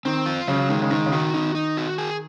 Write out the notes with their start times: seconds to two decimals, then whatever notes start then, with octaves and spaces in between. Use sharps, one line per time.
0.05 D#3 C4
0.26 F4
0.48 C#3 F#3
0.69 D#3 G#3
0.82 C#3
0.91 D#3 D#4
1.06 C#3
1.12 D#3 F#4
1.34 D#3 D#4
1.55 D#4
1.77 F#4
1.98 G#4